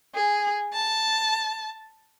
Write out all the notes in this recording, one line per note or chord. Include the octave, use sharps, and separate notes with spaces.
G#4
A5